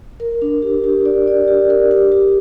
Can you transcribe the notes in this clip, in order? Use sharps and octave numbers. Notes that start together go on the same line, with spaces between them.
A#4
D4
G4
G4
D5
D5
G4
A#4
G4
G4